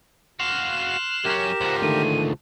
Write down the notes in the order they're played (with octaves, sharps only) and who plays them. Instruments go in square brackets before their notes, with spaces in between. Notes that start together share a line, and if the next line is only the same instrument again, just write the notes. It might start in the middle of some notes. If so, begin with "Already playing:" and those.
[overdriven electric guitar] F#4 F5 [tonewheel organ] C6 F6 F#6 [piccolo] E7
[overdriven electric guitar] F#2 C#4 [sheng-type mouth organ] G4 A#4
[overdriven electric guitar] C#2 F3 [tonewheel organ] C5 F#5 A#5
[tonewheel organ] D3 D#3 A3 [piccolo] D#7